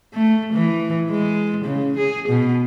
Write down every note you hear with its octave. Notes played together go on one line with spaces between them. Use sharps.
A3
E3
G#3
C#3
G#4
B2